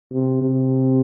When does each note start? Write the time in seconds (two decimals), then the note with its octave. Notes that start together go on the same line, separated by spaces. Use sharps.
0.11 C3
0.42 C3